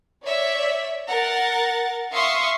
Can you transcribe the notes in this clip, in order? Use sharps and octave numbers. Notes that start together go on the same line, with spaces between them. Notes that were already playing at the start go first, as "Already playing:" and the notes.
C#5 D5 E5
A#4 F#5 A6
E5 F5 C6 C#6 D#6